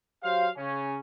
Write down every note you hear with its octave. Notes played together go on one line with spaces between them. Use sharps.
F#3 G4 C5 F5
C#3 C#4